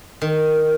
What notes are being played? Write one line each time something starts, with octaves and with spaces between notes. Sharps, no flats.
D#3